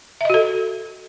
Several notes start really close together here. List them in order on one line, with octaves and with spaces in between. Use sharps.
E5 D#5 F#4 A4